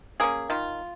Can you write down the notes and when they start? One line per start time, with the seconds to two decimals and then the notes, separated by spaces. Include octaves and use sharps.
0.20 A#3 C#4 G#4
0.50 D#3 F4